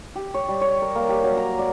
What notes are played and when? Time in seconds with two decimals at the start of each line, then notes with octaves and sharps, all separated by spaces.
0.16 G4
0.34 C#5
0.48 G3
0.61 C#5
0.82 A#4
0.95 A#3
1.09 G4
1.24 F#3
1.37 A#5
1.59 D5